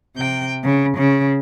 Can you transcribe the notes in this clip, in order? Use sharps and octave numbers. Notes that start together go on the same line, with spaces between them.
C3 G5
C#3
C#3